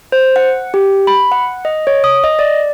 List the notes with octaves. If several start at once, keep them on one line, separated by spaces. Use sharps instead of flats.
C5
F#5
G4
B5
F#5
D#5
C#5
D#6
D#5
D5